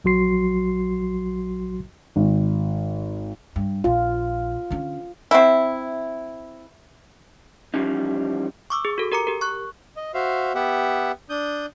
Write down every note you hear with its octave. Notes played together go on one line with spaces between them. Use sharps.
A#1 F#3 F#4 C6 C7
G#1
G2
A#1 F4
D3 C#4
C4 E4 E5
E3 F3 G3 C#4 D#4
C#6 D6 E6
G#4
F#4 A4
G4 A#4 A#5 D6 C#7
G4 A#4
C#6 F#6
D#5
F#4 C5 E5 F5
B3 G4 E5 F#5
D4 D#6 G6